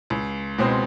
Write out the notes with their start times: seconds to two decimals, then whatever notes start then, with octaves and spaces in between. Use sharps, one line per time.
0.10 C#2
0.58 B2 G#3 C4